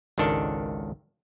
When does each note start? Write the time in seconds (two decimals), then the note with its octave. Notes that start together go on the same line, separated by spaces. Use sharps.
0.18 G#1 C#2 D#3 D4 A4